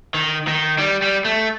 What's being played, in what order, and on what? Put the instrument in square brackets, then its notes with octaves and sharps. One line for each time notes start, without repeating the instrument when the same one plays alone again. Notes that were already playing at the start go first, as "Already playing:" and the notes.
[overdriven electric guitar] D#3
D#3
G3
G3
A3